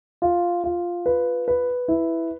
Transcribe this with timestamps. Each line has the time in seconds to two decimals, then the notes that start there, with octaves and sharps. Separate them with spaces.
0.22 F4
0.64 F4
1.06 B4
1.48 B4
1.88 E4